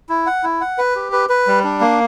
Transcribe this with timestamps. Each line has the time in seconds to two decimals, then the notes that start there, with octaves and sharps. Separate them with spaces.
0.09 E4
0.26 F#5
0.43 E4
0.61 F#5
0.78 B4
0.96 G4
1.12 B4
1.29 B4
1.47 G3
1.64 D4
1.81 A#3